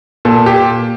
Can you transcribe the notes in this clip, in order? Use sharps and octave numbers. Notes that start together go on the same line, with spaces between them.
A#2 A4
G4